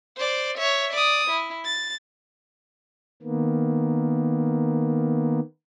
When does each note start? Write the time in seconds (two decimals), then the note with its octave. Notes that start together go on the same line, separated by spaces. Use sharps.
0.18 C5 D5
0.58 C#5 E5
0.93 D5 D#6
1.30 E4
1.65 A6
3.22 D#3 A#3 B3